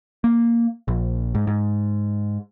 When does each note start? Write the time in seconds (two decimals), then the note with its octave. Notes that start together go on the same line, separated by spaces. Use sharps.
0.24 A#3
0.88 A#1
1.35 G#2
1.47 G#2